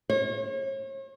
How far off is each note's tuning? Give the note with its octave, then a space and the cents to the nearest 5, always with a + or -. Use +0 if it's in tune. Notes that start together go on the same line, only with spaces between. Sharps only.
C#5 -40